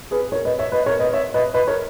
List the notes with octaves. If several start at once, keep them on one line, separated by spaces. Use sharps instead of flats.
G#4 B4
A#4 C#5
B4 D#5
C#5 E5
B4 D#5
A#4 C#5
B4 D#5
C#5 E5
B4 D#5
B4 D#5
A#4 C#5